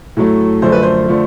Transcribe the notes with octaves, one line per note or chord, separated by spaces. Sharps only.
A2 F#3 A3
F#2 D3 F3 A3 C5
B4
C5
D3 F3 A3